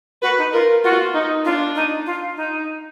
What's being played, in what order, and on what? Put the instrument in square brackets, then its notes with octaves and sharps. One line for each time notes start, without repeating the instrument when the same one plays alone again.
[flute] F#4 [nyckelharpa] B4
[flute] D#4
[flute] F4 [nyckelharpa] A#4
[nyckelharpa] F4 [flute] F#4
[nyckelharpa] D#4
[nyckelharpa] D4 [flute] F4
[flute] D#4
F4
D#4